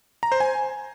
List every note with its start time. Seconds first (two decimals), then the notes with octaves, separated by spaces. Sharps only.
0.23 A#5
0.32 C5
0.40 G#5